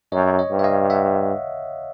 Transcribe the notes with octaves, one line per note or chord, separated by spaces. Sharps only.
F#2 C#5 D#5
C#5 D#5
G2
E5
D#5 F5
E5 F#5